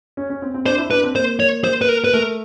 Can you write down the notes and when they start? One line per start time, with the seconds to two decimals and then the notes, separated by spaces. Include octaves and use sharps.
0.17 C#4
0.30 C#4
0.42 C4
0.54 C4
0.66 D4 C5
0.78 E4
0.91 D4 B4
1.03 C4
1.15 A#3 C5
1.40 C#5
1.64 C5
1.82 B4
1.89 A#4
2.04 B4
2.13 A3 A#4